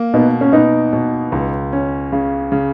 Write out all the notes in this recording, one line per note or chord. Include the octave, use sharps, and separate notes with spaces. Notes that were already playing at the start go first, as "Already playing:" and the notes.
Already playing: A#3
B2 B3 D#4
C#4
B2 B3 D#4
B2
C#2
C#4
C#3
C#3